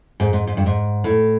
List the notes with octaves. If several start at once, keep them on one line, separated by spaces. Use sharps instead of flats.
G#2
G#2
G#2
G2
G#2
A2